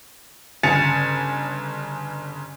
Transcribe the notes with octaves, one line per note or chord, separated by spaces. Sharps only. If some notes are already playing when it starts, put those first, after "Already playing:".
G1 C#3 G#5 A6 C#7 F7